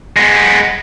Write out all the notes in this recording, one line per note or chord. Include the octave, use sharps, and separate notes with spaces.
G#3 B3